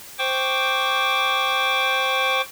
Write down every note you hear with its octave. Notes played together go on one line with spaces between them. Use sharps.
C5 G5 C#6 D6